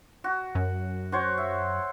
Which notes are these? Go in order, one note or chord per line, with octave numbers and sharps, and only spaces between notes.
F#4
F#2
F#4 C5 C#5
E5